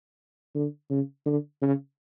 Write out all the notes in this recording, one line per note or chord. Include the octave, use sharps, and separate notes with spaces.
D3
C#3
D3
C#3